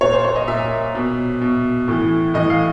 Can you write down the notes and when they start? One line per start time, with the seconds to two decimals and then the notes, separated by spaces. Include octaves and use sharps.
0.01 A#2 C#5
0.13 C5
0.24 C#5
0.36 D#5
0.48 A#2 E5
0.95 B2
1.41 B2
1.88 A2 E3
2.34 A2 E3 D#5
2.50 F5